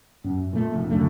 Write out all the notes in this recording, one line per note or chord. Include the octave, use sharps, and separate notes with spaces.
F#2
A#2 A3
F1
C#2 F#2 D3 A3